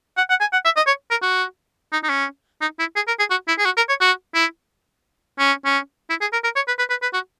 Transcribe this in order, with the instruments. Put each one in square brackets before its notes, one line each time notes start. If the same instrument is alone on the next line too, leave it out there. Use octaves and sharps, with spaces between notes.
[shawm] F#5
F#5
G#5
F#5
E5
D#5
C#5
A#4
F#4
D#4
D#4
C#4
D#4
E4
G#4
A#4
G#4
F#4
E4
G#4
F#4
A#4
C#5
F#4
E4
C#4
C#4
E4
G#4
A#4
A#4
C#5
B4
B4
B4
B4
F#4